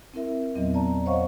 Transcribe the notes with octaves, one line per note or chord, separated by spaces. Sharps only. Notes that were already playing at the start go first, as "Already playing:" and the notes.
C4 E4 A#4 E5
E2 A#2 F#3 B3 C4 D#5
D5 A5 A#5
C5 C#5 D#5 F5 F#5 C#6